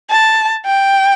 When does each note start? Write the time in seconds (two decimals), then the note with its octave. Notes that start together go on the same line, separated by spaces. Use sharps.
0.10 A5
0.65 G5